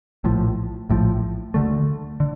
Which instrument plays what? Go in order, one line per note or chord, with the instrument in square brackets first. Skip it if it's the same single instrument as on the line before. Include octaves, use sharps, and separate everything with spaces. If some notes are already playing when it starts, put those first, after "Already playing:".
[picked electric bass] A#1 A2 F3
A#1 A2 F3
D2 D3 A3
D3